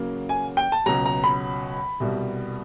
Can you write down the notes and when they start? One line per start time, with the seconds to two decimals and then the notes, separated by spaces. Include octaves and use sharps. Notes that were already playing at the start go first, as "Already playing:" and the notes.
Already playing: C#3 F#3 A#3
0.29 G#5
0.57 G5
0.72 A5
0.86 C#2 B2 F#3 A#5
1.06 A#5
1.24 B5
2.00 C2 B2 G3